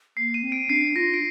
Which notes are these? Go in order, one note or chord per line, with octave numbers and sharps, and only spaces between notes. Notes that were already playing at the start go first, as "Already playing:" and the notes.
A#3 C7
D#7
C4
D7
D4 C7
F4 A#6
D7